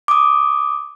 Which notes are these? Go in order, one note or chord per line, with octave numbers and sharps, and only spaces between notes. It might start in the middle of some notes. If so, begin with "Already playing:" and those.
D6 D#6